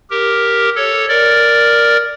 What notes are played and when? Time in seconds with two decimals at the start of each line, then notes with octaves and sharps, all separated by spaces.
0.10 G4 A#4
0.76 A4 C#5
1.08 A#4 D5